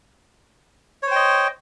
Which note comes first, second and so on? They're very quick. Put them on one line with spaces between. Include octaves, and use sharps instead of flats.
C#5 C5 G5 D#5